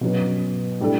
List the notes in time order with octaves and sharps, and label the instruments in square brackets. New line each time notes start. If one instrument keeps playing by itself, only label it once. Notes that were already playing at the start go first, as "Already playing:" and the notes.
[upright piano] B2 F#3 C#4 F#4 B4
A2 G3 D4 A4